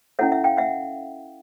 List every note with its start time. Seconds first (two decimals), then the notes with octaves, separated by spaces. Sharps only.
0.19 C#4 E4 A4 C#5 E5 F#5
0.32 E5 F#5
0.44 F5 G5
0.57 E5 F#5